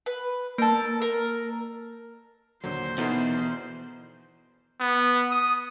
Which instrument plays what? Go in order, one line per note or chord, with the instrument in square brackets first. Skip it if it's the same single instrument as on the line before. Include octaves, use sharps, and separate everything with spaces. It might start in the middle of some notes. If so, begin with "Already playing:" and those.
[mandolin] B4
[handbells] A#3 [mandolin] A4 A#4
[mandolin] A#4
[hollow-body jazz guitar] D#2 A#2 D3 [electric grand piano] F#3 [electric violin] C5
[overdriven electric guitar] E2 [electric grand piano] B2 D#4 [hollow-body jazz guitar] B3 A4 A#4
[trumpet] B3
D#6